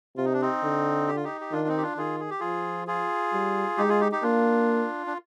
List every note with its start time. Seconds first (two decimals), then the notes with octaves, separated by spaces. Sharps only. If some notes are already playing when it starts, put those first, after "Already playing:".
0.17 C3 F4
0.25 D#4
0.33 D4
0.42 C4 D#4
0.63 D3
1.08 G4
1.16 F4
1.24 D#4 G4
1.41 G4
1.52 D#3 D4 F4
1.68 C4 D#4
1.78 G4
1.82 D4 F4
1.97 D#3 F4 G#4
2.20 G#4
2.30 G4
2.40 F3 F4 G#4
2.87 F4 G#4
3.33 G3
3.77 G#3 D#4 G4
3.89 F4 G#4
4.01 D#4 G4
4.12 D#4 G4
4.22 A#3 D4 F4
5.06 D4